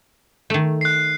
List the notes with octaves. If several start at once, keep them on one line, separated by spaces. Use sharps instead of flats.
D#3 A3
F#6 C7